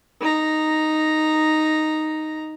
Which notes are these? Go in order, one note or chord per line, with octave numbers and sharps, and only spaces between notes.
D#4 A#5